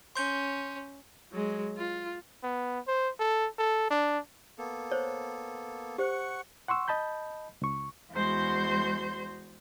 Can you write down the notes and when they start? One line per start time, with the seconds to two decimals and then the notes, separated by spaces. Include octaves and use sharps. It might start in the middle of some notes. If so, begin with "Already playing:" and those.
0.16 C#4 C6 G6
1.31 F#3 G#3
1.77 F4
2.43 B3
2.88 C5
3.19 A4
3.58 A4
3.91 D4
4.58 A#3 B3 A4
4.91 C5 C#5
5.98 G4 C5 F#5 C#6
6.68 F#5 C6 C#6 E6
6.88 D#5 A5 B5 G6
7.62 C#2 C#6
8.13 E2 G#3 F#4 C5 C6 G6